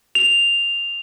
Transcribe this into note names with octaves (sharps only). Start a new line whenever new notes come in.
F7